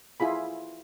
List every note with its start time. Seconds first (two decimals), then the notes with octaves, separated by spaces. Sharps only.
0.20 E4 F4 G#4 B5